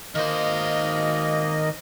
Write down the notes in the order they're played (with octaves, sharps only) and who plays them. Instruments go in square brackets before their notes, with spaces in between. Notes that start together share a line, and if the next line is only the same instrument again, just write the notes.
[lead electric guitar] D#3 C5 [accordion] A#3 D#5